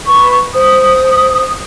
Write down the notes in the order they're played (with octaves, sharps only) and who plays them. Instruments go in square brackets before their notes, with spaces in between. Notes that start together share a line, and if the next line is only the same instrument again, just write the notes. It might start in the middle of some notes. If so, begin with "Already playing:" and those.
[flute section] B4 C#6
[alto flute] C5 [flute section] D#6